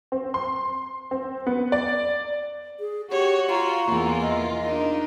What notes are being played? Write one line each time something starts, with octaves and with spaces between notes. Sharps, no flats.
C4
C6
C4
B3
D5
G#4
F#4 G4 C#5
F4 A#5
E2 E3 A#3 F4
D#5
D4 D#4 A#4